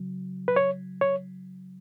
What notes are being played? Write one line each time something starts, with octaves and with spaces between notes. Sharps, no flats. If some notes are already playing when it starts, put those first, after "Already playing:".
Already playing: C#3 F#3
B4
C#5
C#5